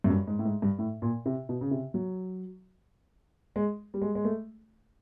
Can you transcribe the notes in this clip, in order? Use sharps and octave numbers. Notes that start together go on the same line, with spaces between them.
F#2
G2
G#2
A2
G#2
G2
A2
A#2
C3
B2
C#3
C3
F#3
G#3
G3
G#3
G#3
A3